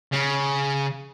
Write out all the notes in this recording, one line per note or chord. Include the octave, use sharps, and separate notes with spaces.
C#3